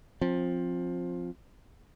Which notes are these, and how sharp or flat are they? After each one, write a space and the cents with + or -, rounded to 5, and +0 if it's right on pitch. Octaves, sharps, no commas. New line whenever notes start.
F3 +10 C4 +20